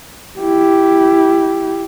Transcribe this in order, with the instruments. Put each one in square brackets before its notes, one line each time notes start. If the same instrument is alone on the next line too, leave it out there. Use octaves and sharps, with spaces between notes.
[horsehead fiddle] E4 G4